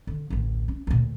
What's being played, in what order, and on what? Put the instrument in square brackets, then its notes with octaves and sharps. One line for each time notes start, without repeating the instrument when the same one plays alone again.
[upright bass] D3
A1 D2
C#4
D2 A#2